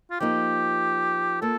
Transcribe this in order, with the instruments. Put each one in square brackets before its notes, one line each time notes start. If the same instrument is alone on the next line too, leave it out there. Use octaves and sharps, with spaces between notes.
[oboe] F4
[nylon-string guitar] F3 A#3 D#4 [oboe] G4
[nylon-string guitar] A#3 F4 [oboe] A4